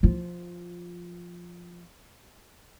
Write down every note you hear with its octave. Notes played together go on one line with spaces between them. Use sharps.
F3 F4